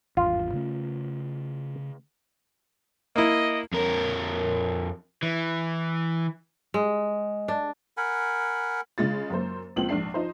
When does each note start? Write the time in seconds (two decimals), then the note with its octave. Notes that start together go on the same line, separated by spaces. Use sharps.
0.17 G#1 E2 G2 F4
0.53 C#3 A3 C#4
3.16 A#3 E4 D#5
3.73 F2 A#4
5.23 E3
6.74 G#3
7.48 D4
7.97 A#4 F#5 G#5 B5
8.98 C#3 G#3 F4 A6
9.30 F#2 A#3 C5
9.76 C#2 A#2 F3 C4 F#7
9.89 A#1 G#2 D4 C7
10.14 F3 D#4 C5